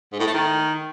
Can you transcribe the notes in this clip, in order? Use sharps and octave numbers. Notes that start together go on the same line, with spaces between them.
G#2
A2
A3
D#3